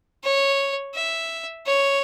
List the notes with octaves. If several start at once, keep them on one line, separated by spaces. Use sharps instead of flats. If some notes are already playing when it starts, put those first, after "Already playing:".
C#5
E5
C#5